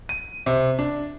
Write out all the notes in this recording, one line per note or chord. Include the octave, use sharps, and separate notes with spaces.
D#7
C3
D4